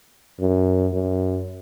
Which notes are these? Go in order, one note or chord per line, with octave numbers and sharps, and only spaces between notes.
F#2
F#2